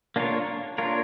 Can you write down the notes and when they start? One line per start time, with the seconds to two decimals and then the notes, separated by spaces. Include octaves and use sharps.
0.16 A#3 D4 F4 A#4 C#5
0.78 A#3 D4 F4 A#4 C#5